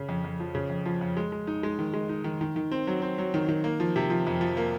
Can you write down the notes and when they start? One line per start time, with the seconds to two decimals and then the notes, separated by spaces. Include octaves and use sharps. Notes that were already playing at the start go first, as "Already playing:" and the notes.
Already playing: C#3
0.09 F2
0.24 F2
0.40 F3
0.55 C#3
0.70 F2
0.85 F3
1.01 F2
1.17 G#3
1.32 G#3
1.47 D#4
1.63 G#3
1.79 D#3
1.93 G#3
2.09 D#4
2.24 D#3
2.41 D#3
2.56 D#3
2.71 C4
2.87 F#3
3.02 C4
3.18 F#3
3.34 D#3
3.48 D#3
3.64 A#3
3.80 F3
3.96 C3
4.10 F3
4.27 F2
4.41 F3
4.57 A#3